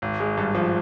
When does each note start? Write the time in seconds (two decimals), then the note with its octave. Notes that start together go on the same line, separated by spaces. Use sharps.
0.02 G#1
0.20 G#3
0.37 G2
0.55 F3